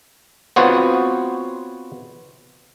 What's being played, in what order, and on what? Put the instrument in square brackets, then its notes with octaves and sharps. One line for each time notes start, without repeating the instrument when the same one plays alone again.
[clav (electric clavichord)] B3 C4 F4 F#4 C5 C#5